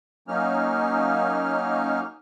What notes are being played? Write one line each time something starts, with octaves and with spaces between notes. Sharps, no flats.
F#3 A#3 C#4 D#4 F6